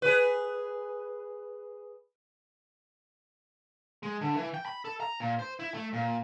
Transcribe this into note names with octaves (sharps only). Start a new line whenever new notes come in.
G#4 B4
G#3
D3
E3
G5
B5
A4
A#5
A#2
C5
E4
A3
A#2